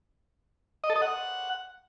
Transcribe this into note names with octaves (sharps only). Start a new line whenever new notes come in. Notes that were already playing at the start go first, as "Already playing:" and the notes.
D#5
A4
D#5
F#5